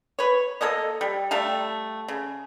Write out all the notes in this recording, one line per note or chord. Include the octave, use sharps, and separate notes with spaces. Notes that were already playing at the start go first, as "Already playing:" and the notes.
B4 C#5
A#3 A4 C#5 D#5
G3
G3 A3 F5 A5
C#3